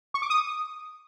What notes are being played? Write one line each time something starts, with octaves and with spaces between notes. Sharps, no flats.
C#6
D6
D#6